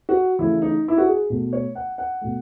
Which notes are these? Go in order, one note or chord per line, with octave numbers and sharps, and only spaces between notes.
F#4
C#3 E3 A3 E4
D#4
E4
F#4
G#4
B2 A3
C#5
F#5
F#5
B2 A3